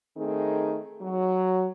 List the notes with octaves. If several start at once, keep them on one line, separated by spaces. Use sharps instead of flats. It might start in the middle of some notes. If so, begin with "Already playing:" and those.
D#3 A3 C4 D#4 G#4
F#3